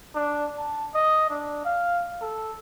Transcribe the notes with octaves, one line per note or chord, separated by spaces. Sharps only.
D4
A5
D#5
D4
F5
A4